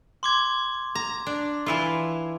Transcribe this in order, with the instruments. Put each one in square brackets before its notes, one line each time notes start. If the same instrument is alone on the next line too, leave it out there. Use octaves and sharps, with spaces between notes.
[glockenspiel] C6 D6 G#6
[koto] A#5
D4
E3 E4 F4